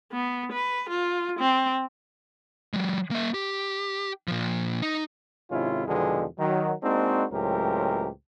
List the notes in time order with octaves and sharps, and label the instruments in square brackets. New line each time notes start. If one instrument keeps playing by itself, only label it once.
[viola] B3
B4
F4
C4
[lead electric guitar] F#3 G#3
A#3 E5
G4
A#2 F3
D#4
[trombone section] G#2 C3 D#3 C#4 E4 F4
E2 B2 D3 D#3 F3 G#3
D#3 F#3
G#3 A#3 C4 D4 D#4 F#4
C#2 A2 F#3 C4 G4 A#4